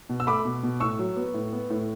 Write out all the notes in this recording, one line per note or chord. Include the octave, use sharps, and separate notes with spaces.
B2
E6
A3 B5 D6
B2
B2
A2 C#6 E6
F#3
B3
A2
B3
A2